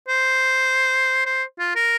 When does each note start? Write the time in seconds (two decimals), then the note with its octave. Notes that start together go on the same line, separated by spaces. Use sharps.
0.09 C5
1.26 C5
1.59 F4
1.76 A#4